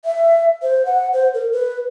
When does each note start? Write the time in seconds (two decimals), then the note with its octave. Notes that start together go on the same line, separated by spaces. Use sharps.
0.05 E5
0.62 C5
0.86 F#5
1.13 C5
1.34 A#4
1.52 B4